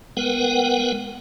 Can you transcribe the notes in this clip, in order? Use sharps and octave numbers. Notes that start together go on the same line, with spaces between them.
G#3 B3 A#4 B4 F#5 G5